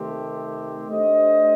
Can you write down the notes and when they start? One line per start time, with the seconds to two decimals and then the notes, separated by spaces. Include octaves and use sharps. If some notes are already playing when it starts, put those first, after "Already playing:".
Already playing: C3 D#3 A3 C4 G4
0.89 A3 D4 G4 C5 D#5